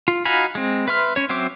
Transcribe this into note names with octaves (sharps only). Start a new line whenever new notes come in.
F4
D#4 F#4 F5 G#5 B5
G#3 C4
B4 E5 C6 F6
C#4 C#5
F#3 C4 C5 E5 D6